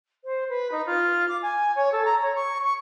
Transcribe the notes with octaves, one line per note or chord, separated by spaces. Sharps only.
C5
B4
D#4
F4
D6
G#5
C#5
A4
A#5
C#5
C#6
C#6